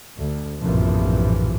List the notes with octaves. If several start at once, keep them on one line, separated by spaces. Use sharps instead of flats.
D2
A#1 F#2 A2 C3 E3 F3